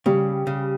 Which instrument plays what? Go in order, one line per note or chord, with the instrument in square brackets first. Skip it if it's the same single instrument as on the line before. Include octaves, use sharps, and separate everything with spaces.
[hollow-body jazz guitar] C#3 [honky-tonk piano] G3
[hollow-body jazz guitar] C#3